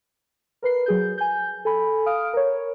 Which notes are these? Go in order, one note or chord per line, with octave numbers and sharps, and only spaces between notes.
A#4 B4 C7
F#3 G#4 G6
G#5 G6
A4 G#5 B5
F5 D#6 F6 D7
A#4 C#5